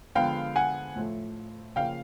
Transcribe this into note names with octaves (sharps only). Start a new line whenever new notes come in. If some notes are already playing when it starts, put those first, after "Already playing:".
D3 F3 G#3 B3 F5 G5
F#5 G#5
A2 F3 A3
C#3 F3 A#3 F5 G5